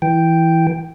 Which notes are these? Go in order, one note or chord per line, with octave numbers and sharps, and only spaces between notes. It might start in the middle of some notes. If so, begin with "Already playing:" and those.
E3 G5